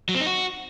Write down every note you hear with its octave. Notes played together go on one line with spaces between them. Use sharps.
F#3
C4
D#4
F#4